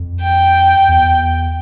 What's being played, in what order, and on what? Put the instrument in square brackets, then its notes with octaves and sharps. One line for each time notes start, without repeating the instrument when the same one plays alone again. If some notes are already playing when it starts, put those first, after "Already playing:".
Already playing: [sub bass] F2
[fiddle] G5
[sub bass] E2